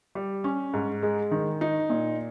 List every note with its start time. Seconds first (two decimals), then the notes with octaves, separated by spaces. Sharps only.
0.15 G3
0.44 C#4
0.74 G#2
1.03 G#3
1.31 D#3
1.61 D#4
1.90 A#2